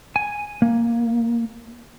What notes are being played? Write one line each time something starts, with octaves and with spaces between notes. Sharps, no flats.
G#5
A#3